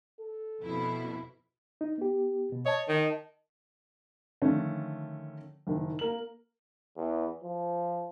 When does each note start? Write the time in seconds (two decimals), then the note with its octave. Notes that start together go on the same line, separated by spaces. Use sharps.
0.21 A4
0.61 F2 B2 E4
1.81 D#4
1.98 B3 G4
2.52 B2
2.66 C#5 D#5 A5
2.88 D#3
4.42 D3 D#3 F3 A3 C#4
5.67 F#1 D#3
5.99 A#3 A#4 F#7
6.97 E2
7.43 F3